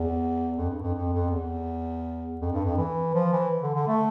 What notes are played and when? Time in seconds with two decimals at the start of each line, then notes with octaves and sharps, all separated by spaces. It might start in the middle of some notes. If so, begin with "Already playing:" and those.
Already playing: E2
0.58 F2
0.70 G2
0.83 F2
0.95 F2
1.13 F2
1.31 E2
2.41 F2
2.53 G2
2.66 F2
2.78 E3
3.15 F3
3.33 E3
3.63 D3
3.75 D3
3.88 A3